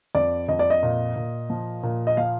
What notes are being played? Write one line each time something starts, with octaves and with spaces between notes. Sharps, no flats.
F2 D5
F2 D#5
D5
D#5
A#2
A#2
F3
A#2
D#5
F3 F5